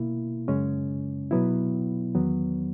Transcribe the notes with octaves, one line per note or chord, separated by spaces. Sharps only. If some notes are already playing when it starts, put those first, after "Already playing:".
Already playing: B2 A#3 E4
F#2 C#3 G#3 C#4
B2 F#3 B3 E4
E2 D#3 F#3 B3